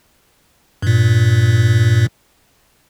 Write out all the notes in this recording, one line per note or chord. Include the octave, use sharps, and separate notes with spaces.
G2 A#2